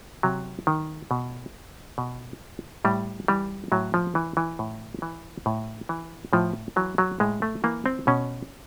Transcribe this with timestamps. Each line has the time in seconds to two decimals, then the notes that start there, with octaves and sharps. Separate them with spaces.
0.23 C3 F#3
0.67 D#3
1.11 B2
1.98 B2
2.85 A2 G3
3.28 E3 G3
3.72 A2 F#3
3.94 F3
4.15 E3
4.37 E3
4.59 A2
5.02 E3
5.46 A2
5.89 E3
6.33 A2 F3
6.76 E3 F#3
6.98 F#3
7.20 A2 G#3
7.42 A3
7.64 E3 A#3
7.86 C4
8.07 B2 C#4